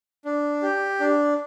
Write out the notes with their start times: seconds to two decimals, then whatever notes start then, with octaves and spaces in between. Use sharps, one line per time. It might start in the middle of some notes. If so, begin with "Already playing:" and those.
0.25 D4
0.62 G4
1.00 D4